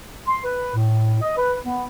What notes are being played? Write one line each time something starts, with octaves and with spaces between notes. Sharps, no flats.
C6
B4
A2
D#5
B4
B3